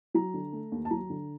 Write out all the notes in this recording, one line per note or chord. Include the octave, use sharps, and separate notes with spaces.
F#3 A#5
D3
A3
D#2
A5
F#3 A#5
D3